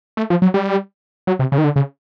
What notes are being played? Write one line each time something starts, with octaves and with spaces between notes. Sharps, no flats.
A3
F3
F#3
G3
F#3
C3
C#3
D#3
D3
C#3